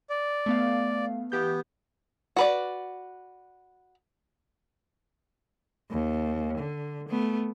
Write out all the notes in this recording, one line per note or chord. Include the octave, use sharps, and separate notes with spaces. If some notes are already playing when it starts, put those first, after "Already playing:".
D5
A3 B3 F5
E3 B3 G4 G6
F#4 B4 D5
D#2
D3
A3 B3